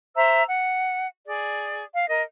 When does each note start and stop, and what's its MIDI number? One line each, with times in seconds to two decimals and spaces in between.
0.16 0.43 72
0.16 0.43 76
0.16 0.43 82
0.16 0.43 88
0.47 1.06 78
1.26 1.84 68
1.26 1.84 74
1.95 2.08 77
2.08 2.21 70
2.08 2.21 75